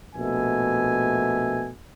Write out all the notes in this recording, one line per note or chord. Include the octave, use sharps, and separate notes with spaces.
A#1 B2 A3 E5 G#5